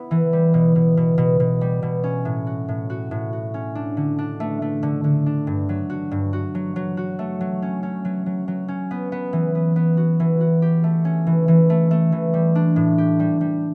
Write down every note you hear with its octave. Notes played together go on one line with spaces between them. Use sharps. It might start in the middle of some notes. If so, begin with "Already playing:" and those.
Already playing: B3 E4
E3
G3
B2
B2
B2
B2
B2
G3
B2
C#4
A2
F#4
A2
F#4
A2
F#4
C#4
D4
D3
D4
A3
A3
D3
D3
D4
G2
F#3
F#4
G2
F#4
F#3
F#3
F#4
A3
F#3
C#4
C#4
F#3
F#3
F#3
C#4
B3
B3
E3
B3
B3
F#4
E3
F#4
G4
A3
C#4
E3
E3
A3
A3
E3
G3
D4
A2
G4
G3
G3